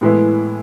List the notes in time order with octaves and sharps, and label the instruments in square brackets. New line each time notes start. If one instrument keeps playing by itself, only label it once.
[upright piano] A2 E3 G#3 B3 E4